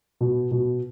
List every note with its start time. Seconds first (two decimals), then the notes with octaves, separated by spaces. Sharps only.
0.21 B2
0.51 B2